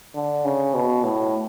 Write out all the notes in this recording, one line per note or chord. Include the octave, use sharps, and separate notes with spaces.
D3
C#3
B2
A2